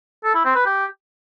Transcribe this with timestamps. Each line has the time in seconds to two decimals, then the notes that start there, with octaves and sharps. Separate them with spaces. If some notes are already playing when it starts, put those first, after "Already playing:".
0.24 A4
0.34 E4
0.45 C4
0.55 B4
0.66 G4